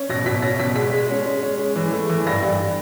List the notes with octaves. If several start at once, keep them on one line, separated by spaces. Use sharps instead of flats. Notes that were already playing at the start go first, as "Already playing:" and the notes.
Already playing: C#4
B2 A#6
B2 B6
C#4 A#6
B2 B6
G#3 B6
G#3
C#4
G#3
C#4
G#3
E3
A3
E3
G2 A#6
G2